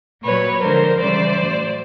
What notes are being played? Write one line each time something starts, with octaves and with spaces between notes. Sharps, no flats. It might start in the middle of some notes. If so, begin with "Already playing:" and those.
A#2 F#3 B4 C#5
D3 F3 G#3 A#4 C5
C#3 E3 G3 C5 D5
A2 F#3